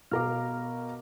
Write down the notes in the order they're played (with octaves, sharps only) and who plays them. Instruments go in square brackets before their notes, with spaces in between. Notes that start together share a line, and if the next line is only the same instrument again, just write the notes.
[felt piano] B2 A#4 D6 [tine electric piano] F5 A#5 F6